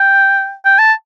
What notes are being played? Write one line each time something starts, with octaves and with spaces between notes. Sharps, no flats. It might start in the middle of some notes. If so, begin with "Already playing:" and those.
Already playing: G5
G5
A5